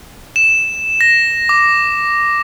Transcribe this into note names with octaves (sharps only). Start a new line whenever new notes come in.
E7
A#6
D6